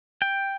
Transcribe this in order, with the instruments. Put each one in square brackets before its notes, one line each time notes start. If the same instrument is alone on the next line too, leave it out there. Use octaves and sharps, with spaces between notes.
[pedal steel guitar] G5